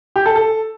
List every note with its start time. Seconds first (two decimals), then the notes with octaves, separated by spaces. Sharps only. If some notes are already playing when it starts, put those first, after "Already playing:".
0.16 G4
0.26 A4
0.36 A4